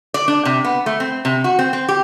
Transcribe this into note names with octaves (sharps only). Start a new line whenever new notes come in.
D5
D4
C3
B3
A3
C4
C3
F#4
C4
C4
G4